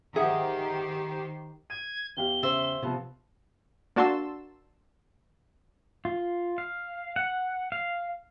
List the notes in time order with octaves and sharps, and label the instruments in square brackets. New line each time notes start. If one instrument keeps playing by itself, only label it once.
[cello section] D#3 G4 C5 [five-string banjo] G#4 [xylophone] E5 F#5 D#6
[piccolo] G#6 [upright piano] D#7
[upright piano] E2 G4 F5 [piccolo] G7
[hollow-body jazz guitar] C#3 [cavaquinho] C5 E5
[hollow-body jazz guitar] C3 [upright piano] F3 B3 F4
[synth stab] A#3 D4 F#4 A5 C6 E6
[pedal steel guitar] F4
F5
F#5
F5